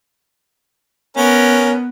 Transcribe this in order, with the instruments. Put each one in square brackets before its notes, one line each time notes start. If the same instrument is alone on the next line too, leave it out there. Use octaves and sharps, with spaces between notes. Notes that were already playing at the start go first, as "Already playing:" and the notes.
[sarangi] B3 [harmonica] C#4 A#4